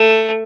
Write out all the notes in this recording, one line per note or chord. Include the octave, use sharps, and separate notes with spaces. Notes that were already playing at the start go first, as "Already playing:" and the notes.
Already playing: A3